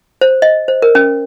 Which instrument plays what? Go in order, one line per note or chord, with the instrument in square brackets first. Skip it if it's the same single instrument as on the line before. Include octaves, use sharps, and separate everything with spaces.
[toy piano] C5
D#5
C5
A#4
C#4